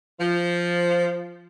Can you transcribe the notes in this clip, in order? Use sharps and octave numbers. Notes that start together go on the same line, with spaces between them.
F3